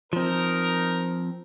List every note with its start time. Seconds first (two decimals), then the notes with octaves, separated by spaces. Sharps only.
0.13 F3 C4 D#4 A#4